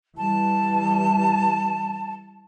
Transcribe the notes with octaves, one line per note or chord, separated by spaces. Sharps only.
E3 G3 A5